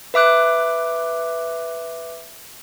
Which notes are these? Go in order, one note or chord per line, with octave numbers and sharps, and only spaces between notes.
B4 E5 D6 F#6